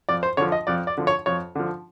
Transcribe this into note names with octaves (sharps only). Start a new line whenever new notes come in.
F2 D5
C5
D3 F3 C#5
D#5
F2 D5
D5
D3 F3
C#5
F2 C#5
D3 F3